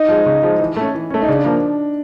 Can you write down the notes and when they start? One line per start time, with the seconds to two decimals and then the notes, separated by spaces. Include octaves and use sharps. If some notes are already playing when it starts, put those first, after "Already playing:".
Already playing: D#4
0.08 F3 G#3
0.26 C#3
0.43 F3 G#3
0.60 E3
0.76 A3 C#4
0.94 E3
1.10 A3 C#4
1.22 D#4
1.28 C#3 D4
1.45 F3 A#3